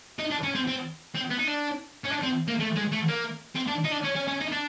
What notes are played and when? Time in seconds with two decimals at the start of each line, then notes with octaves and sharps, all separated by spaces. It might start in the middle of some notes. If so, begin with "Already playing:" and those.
0.19 D#4
0.31 D4
0.43 C#4
0.55 C4
0.68 C4
1.15 C4
1.31 B3
1.39 D#4
1.48 D4
2.05 C#4
2.11 D4
2.23 C4
2.48 A#3
2.60 A3
2.76 G#3
2.92 A3
3.08 A#3
3.55 C4
3.67 D4
3.84 D#4
3.91 D4
4.04 C#4
4.15 C#4
4.27 C#4
4.41 D#4
4.52 D4